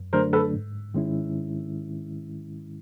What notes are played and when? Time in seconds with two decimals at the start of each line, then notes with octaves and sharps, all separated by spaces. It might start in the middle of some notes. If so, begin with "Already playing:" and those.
Already playing: F#2
0.13 D3 F#3 A3 D4 A#4 C5
0.33 A4 B4
0.54 G#2
0.94 D#3 G#3 C#4 E4